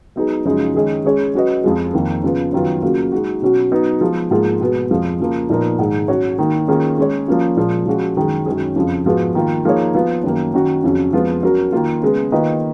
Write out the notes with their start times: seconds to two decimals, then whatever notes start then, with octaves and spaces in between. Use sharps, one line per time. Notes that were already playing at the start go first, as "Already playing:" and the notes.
0.16 F#3 B3 D#4 G#4
0.45 F#2 C#3 F3 G#3 D#4
0.75 D#3 G#3 C#4 G#4 D#5
1.04 G#3 C#4 G#4 C#5
1.34 F#3 C#4 F#4 B4 D#5
1.64 F2 F3 G#3
1.93 F2 D#3 A#3
2.23 C#3 F3 B3 F4
2.53 F#2 D#3 F#3 B3 F4
2.82 C#3 F#3 A#3 F4
3.12 G#3 D#4 F#4
3.42 B2 F#3 C#4 F#4
3.72 F#3 B3 D#4
4.01 F3 G#3 B3
4.31 G#2 F3 A#3 F4 G#4
4.60 B2 G#3 B3
4.91 F2 F3 G#3
5.20 C#3 F3 A#3
5.49 A#2 F3 B3 D#4 A#4
5.79 G#2 D#3 G#3 D#4
6.08 F#3 C#4 F#4 C#5
6.39 D#3 A#3 D#4
6.68 D#3 A#3 C#4 F4 G#4
6.98 G#3 C#4 G#4 C#5
7.28 F3 A#3 C#4 F4
7.57 A#2 F3 G#3
7.86 F3 G#3 C#4 F#4
8.17 F#2 D#3 G#3
8.46 F#2 D#3 G#3 C#4 G#4
8.76 F2 C#3 F3
9.06 G#2 F3 G#3 B3 F#4
9.35 D#3 A#3 F4
9.65 F3 A#3 D#4 G#4 C#5
9.94 F3 B3 F4
10.24 F#2 D#3 A#3
10.54 D#3 F#3 C#4 F#4
10.84 F2 C#3 F#3 C#4
11.13 F2 F3 G#3 B3 F4
11.43 F#3 C#4 F#4 A#4
11.72 D#3 A#3 F4
12.02 C#3 G#3 B3
12.32 D#3 A#3 F4 B4 D#5